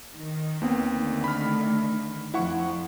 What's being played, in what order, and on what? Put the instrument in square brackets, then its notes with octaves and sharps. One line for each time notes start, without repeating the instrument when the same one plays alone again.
[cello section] D#3
[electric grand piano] D#2 B3 C4
[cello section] D3 D#3 A3
[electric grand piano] B5 F6
[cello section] F2 [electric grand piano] E4 F#5 C#6